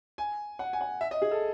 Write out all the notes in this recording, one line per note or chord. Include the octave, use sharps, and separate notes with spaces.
G#5
F#5
G#5
F#5
E5
D#5
G#4
A4